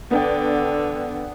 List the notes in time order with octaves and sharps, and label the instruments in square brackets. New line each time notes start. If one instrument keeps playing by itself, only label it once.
[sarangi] D3 [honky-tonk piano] B3 D4 G5